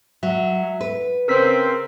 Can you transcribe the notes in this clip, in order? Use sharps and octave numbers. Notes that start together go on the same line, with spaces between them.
F#3 E5
B4
C#3 C4 A#4 E6 B6